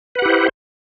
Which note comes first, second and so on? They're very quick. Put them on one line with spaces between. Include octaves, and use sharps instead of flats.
B4 F#5 G4 E4 C5